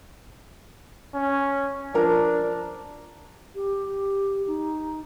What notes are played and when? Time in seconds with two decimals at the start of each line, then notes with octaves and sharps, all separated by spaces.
1.14 C#4
1.94 F3 D4 A#4
3.55 G4
4.47 D#4